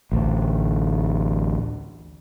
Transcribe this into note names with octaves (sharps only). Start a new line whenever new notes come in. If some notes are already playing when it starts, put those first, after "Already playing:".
A1 D2